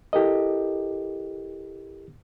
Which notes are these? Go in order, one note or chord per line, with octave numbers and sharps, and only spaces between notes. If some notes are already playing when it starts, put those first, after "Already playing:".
E4 G4 A4 A#4 D#5